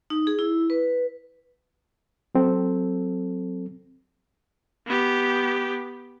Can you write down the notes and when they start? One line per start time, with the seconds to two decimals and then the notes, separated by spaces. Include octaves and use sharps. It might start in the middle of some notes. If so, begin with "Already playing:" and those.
0.10 D#4
0.27 G#4
0.39 E4
0.70 B4
2.35 F#3 C4 A4
4.87 B3 G4